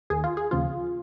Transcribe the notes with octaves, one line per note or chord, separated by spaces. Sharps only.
D#2 D#3 G#4
F4
G#4
D#2 C#3 F3 F4